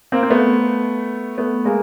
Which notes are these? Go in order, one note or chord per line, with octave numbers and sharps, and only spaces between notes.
A#3 C4
C4
A3 B3
A3 B3
G#3 A#3